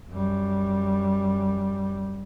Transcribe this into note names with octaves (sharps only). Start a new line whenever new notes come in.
F#2 G3